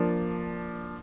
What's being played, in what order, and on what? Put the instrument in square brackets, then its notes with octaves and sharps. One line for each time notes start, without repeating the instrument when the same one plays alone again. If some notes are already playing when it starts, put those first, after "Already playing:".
Already playing: [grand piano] F3 A#3 D4